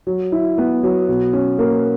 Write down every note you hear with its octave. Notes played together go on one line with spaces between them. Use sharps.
F#3
E4
B3
F#3
B2
C#4
A#3